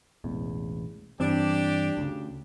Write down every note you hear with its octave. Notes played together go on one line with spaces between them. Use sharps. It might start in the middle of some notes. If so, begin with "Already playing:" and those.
E1 A1 E2
G2 E3 C4 D4 G4
D2 C#3